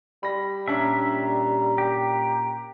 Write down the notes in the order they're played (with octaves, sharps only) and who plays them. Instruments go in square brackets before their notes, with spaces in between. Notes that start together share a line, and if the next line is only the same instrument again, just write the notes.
[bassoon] G3 [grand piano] B5 A#6
[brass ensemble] A#2 A#5 [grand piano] C#4 D4 C#5 [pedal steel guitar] E5
[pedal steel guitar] G4